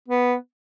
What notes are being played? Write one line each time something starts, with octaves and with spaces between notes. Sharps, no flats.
B3